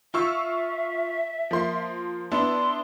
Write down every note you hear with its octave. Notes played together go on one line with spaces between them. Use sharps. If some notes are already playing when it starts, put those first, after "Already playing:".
F4 E5 C#6 E6
F3 A#3 C6
B3 D4 E4 C6